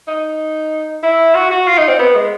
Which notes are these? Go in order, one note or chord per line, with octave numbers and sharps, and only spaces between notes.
D#4
E4
F#4
F#4
F4
D#4
C4
B3
G#3